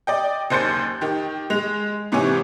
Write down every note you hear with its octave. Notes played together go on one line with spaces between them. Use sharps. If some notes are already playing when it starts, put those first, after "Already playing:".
D5 D#5 G5
F#1 D#2 C5 G6 A6 C#7
D#3 G4
G#3 F7
G#2 C3 E3 C#5 G#5